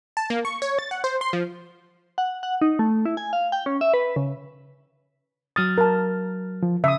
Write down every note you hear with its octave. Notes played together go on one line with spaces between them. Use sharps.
A5
A#3
C#6
C#5
A6
F#5
C5
C6
F3
F#5
F#5
D#4
A3
E4
G#5
F5
G5
C#4
E5
B4
C#3
F#3 D#6 F6 A6
A#4 A5
F3
C#3 E5 D#6